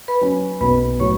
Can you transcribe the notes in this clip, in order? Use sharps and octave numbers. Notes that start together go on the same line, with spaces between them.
B4 B5
F#3 C#4
B1 B4 B5
A2 F#3 C#5 C#6